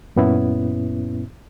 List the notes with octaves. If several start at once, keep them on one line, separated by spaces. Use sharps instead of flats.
F#2 A#2 B3 C#4 E4